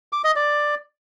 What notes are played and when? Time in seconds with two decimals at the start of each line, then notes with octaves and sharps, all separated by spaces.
0.13 D6
0.24 D#5
0.36 D5